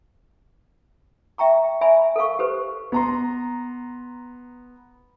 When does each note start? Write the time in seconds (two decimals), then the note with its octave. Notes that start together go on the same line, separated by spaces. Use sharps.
1.38 E5 G5 A#5 C#6
1.81 D5 E5 G#5 A#5 B5
2.16 A4 A#4 F5 C#6
2.39 G4 A4 B4 C5
2.92 B3 A#5 C6